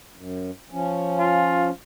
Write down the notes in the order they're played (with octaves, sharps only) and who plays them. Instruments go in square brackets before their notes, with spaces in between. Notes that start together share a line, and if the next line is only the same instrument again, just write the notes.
[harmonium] F#2
F3 C#4
[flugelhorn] F4